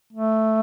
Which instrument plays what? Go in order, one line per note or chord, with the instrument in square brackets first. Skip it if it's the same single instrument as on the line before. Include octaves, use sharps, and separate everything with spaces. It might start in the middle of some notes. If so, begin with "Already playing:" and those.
[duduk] A3